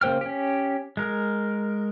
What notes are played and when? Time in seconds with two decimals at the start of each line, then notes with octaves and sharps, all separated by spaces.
0.01 C#3 A#3 C5 G5 F6
0.21 C#4 G4
0.97 G#3 A#4